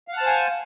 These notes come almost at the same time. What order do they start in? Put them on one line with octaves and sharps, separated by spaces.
F5 F#5 A5 C5 G#5